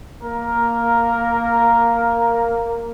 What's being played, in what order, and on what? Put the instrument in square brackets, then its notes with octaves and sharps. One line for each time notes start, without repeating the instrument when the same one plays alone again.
[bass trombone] A#3 [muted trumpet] A#4